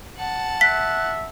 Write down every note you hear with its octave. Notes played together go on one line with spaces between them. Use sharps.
F#5 A5
E5 F#6 B6